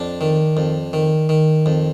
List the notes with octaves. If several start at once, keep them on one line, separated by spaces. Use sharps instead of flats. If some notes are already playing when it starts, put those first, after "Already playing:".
Already playing: F2 D4
D#3
F2
D#3
D#3
F2